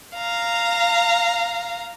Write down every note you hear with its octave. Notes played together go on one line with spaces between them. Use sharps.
F5 A#5